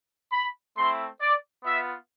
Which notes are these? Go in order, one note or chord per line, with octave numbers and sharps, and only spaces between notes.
B5
A3 C4 E4 C6
D5
B3 F4 E5